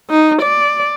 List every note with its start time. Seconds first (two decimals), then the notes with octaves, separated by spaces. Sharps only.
0.10 D#4
0.42 D5